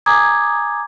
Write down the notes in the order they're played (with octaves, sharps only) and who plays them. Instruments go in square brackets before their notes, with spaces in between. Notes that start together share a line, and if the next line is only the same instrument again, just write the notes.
[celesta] G#5 A#5 D6 D#6 G#6